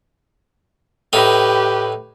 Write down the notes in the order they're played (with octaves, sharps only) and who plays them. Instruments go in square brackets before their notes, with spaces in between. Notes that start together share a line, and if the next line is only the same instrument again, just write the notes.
[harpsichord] A2 D#4 [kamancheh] G4 B4